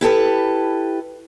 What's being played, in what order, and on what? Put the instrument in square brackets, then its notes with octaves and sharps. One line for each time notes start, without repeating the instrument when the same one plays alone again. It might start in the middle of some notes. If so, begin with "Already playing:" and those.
[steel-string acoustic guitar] E4 G4 A4 B4